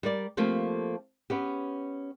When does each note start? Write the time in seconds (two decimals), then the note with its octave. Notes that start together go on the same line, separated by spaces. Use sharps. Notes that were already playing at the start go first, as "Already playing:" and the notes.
0.03 G3 A#4 D5
0.37 F3 A3 A#3 C4 G4 A4
1.30 B3 C#4 G4